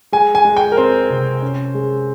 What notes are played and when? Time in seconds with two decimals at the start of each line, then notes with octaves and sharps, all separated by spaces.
0.12 G#3 G#5
0.35 G#5
0.45 G#3
0.57 G5
0.72 A#4
0.77 C4 C5
1.10 C3
1.42 C#4
1.75 G#3